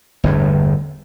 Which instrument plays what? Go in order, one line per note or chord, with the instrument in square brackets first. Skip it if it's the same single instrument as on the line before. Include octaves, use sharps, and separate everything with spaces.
[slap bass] G1 E2 A2